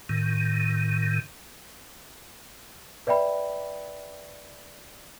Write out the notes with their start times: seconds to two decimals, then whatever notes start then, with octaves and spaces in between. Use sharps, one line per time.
0.09 A2 D#3
3.07 B4 D5 E5 G5 B5